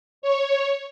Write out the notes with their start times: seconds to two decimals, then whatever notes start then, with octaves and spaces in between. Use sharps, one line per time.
0.22 C#5